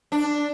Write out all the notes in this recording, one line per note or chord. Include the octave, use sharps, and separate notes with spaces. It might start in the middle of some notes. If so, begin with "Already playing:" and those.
D4